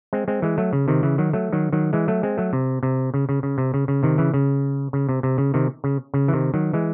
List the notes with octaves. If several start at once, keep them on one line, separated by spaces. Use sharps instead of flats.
G#3 C4
G#3 C4
E3 G#3
F#3 A3
C#3
C3 D#3
C#3 E3
D#3 F#3
F#3 A3
D#3 F#3
D#3 F#3
E3 G#3
F#3 A3
G#3 C4
F#3 A3
C3
C3
C#3
C#3
C#3
C3
C#3
C#3
C3 D#3
C#3 E3
C#3
C#3
C3
C3
C#3
C3 D#3
C#3
C#3
E3
C3 D#3
D#3 F#3
E3 G#3